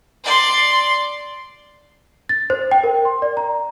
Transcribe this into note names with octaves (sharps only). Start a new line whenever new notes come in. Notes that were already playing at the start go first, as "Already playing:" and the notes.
D5 C6
A6
C5
G5
A#4
C6
D5
A#5